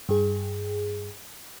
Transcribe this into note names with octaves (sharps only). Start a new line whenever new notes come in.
G2 G#4